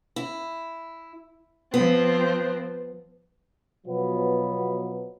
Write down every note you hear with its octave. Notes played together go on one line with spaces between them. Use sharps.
E4
F3 B3 C4
B2 F3 F#3 B3